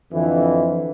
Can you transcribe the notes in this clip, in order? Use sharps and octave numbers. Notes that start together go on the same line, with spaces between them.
F2 D3 E3